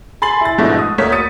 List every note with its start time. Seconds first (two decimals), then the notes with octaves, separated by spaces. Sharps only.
0.22 G#5 B5 C6 A6 C7 F#7
0.41 E4 A6
0.58 G#2 B2 F3 A3 D4 E4
0.79 D#6
0.98 D2 A3 A#3 C#5 B6
1.12 D#6 A6 C#7 D#7